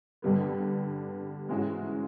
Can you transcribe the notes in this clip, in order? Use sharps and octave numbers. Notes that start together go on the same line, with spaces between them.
G2 D3 G3 B3
G#2 E3 G#3 C#4 F#4